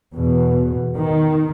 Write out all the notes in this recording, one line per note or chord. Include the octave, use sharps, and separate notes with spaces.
E2 B2
D#3